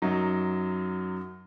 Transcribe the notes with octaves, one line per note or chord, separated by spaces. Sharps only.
F#2 F#3 D#4